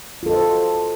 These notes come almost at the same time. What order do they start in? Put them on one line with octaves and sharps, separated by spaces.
F4 A4 D#5 C5 F#4